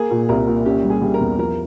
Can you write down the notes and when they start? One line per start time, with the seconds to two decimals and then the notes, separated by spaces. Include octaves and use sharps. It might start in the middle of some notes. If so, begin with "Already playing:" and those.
Already playing: A#3 G#4
0.11 A#2
0.29 C2 A#4
0.47 A#2
0.65 C#4 G4
0.84 G3
0.90 G#4
1.02 G3
1.14 A#4
1.20 E2
1.38 F3 A#4